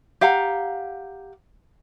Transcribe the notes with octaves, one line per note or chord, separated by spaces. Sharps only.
G4 F5 F#5 A#5